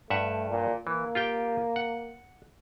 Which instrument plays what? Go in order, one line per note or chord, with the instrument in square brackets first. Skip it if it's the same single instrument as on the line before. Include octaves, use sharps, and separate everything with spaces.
[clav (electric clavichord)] G2 E5 F#5 [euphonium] A3
[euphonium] A#2
[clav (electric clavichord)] E3 [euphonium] A#3
[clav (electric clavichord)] F4 G4 G5
F#5